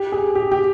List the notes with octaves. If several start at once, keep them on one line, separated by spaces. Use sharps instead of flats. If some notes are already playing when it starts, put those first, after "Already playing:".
Already playing: G4
G#4
G4
G4